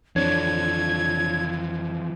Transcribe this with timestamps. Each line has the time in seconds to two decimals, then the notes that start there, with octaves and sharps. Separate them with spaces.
0.16 F2 E3 F3 D4 C#5 G#6